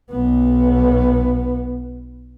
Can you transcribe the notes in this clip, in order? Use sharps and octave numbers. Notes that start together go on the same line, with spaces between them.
B1 B3